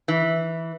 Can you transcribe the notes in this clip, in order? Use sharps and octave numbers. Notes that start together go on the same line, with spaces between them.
E3